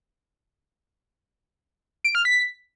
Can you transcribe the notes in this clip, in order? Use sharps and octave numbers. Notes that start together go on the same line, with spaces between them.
D7
F6
B6